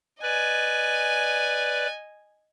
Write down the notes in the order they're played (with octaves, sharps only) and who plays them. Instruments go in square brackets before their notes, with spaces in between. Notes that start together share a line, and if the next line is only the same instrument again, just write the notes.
[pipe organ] B4 D5 [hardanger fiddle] D#5 G#5